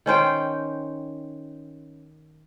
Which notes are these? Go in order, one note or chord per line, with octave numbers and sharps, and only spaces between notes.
D#3 C#4 C5 G5